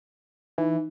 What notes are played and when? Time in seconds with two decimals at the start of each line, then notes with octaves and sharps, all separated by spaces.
0.58 E3 D#4